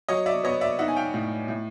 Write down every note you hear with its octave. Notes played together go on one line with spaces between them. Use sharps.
F#3 C#5 D#5
D5 E5
B3 C#5 D#5
D5 E5
D#4 E5 F#5
G#5
F5 G5
A2
A2